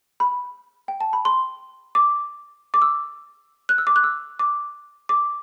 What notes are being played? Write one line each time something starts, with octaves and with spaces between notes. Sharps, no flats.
B5
G5
A5
B5
C6
D6
D6
E6
F#6
E6
D6
F#6
E6
D6
D6